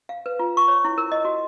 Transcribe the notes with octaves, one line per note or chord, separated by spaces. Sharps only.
F5
B4
F4
C#6
C#5
E4
A#4
D#5
F#4